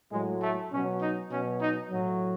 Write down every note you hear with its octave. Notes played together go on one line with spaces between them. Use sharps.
A2 F#3 G#3
A3
B2 F#3 C#4
D#4
B2 F#3 C#4
D#4
A2 F#3